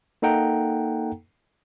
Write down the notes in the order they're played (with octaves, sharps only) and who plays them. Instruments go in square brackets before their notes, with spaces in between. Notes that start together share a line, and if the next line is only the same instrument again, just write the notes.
[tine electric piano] A#3 D#4 A4 F#5 G5 A#5